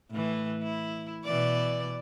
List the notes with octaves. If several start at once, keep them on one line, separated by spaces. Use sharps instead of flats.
A2 E3
E4
B2 E3 D5